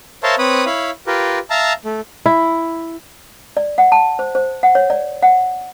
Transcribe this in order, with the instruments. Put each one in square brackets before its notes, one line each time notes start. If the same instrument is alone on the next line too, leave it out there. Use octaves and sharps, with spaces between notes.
[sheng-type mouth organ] A#4 C5 C#5 E5 F5 A5
C4 B4 C#5 B5 D#6
E4 C#5 F5 B5
F4 G4 A#4 B4
E5 F5 A5 A#5
A3
[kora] E4
[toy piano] D5
F#5
A5
C5
C5
F#5
C#5
D5
F#5